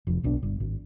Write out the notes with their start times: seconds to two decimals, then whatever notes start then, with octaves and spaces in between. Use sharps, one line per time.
0.07 F1 F2
0.23 D1 B1 D4
0.43 G1
0.60 G#1